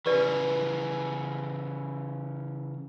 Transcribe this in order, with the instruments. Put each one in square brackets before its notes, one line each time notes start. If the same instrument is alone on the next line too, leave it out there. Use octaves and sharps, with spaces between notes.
[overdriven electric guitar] C#3 E3 [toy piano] G4 B4 D5